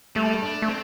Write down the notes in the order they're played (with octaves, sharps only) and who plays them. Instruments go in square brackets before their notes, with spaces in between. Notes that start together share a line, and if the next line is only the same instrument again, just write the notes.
[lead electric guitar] G3 [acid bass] A3
[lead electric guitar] D4
[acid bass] A3
[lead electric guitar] C4